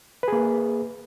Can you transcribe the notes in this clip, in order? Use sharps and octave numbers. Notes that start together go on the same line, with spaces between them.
A#3 G#4 B4